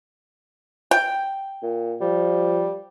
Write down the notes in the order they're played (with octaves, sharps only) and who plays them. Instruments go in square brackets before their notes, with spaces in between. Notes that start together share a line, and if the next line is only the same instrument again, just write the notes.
[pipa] G5
[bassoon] A#2
[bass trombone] F3 [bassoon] G3